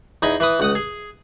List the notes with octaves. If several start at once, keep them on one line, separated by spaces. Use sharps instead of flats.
E2 D#4 G#5 B5
E3 B4 B5 D#6
C#2 F#5 D#6
G#4